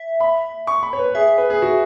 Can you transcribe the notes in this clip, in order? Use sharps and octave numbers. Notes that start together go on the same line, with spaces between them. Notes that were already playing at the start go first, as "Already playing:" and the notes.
Already playing: E5
B5
C#6
B5
C#5
B4
G#4 E5
B4
G#4
F#4